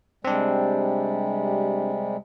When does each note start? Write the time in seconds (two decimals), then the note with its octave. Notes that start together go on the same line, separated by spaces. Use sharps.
0.25 C3 G3 G#3 C4 D4